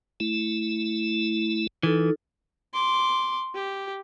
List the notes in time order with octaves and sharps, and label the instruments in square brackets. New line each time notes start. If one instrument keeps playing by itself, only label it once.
[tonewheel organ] A3 E4
[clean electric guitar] E3 [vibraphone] D#4 F4 A4
[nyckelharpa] C6 D6
G4